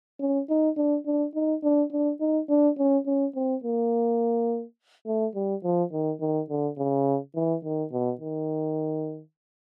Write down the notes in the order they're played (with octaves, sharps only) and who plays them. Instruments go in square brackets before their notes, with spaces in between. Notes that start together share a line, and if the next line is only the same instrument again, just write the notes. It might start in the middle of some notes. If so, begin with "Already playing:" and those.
[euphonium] C#4
D#4
D4
D4
D#4
D4
D4
D#4
D4
C#4
C#4
C4
A#3
A3
G3
F3
D#3
D#3
D3
C#3
E3
D#3
B2
D#3